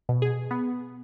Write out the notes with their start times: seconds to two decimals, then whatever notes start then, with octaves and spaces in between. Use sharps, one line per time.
0.09 B2
0.22 G#4
0.51 B3